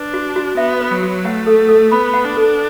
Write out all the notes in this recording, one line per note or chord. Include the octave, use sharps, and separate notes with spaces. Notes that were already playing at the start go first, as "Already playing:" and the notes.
Already playing: D4 B4
F#4
F#4
B3 E5
B4
F#3
F#4
A3 F#5
A4
A4
B3 B5
F#5
D4
A4